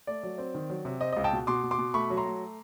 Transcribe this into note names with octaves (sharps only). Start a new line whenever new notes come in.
A3 D5
F#3
C4
D#3
F#3
C3
C4 D#5
C#2 D#5
G5 A5
B2
B2 C6 D6
B2
C6 D6
B2
A3 B5 C#6
F#3
A#5 C6
A3